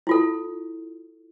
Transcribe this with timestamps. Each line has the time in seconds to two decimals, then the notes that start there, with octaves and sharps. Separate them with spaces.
0.07 E4 F4 A4